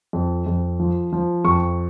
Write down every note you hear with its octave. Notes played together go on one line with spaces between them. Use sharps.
F2
F2
F3
F3
F2 C#6